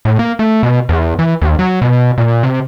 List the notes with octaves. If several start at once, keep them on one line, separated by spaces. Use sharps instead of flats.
A2
A#3
A3
B2
E2
E3
D#2
F#3
B2
A#2
C3